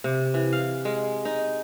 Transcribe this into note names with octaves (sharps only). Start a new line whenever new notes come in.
C3
E3
F5
G#3
D#4